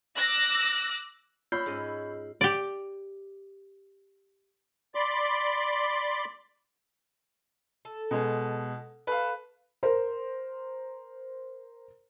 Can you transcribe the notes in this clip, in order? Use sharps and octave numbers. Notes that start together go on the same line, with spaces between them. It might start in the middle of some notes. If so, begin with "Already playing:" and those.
D6 E6 F#6 A#6
F4 C#5 B5 E6 G6
G#2 C#4 D#5
G4 D5
D5 B5 C6 D6
A4
B2 G#3
A3 B4 F5
A#4 C5